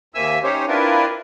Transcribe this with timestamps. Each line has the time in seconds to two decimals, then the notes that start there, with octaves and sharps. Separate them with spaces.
0.14 D#2 A#3 C4 E5 G#5 E6
0.43 C#4 D#4 G4 C5 C#5
0.68 C4 D4 E4 F4 A#4 B4